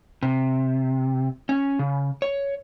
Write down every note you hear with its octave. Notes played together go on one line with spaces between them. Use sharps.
C3
C#4
C#3
C#5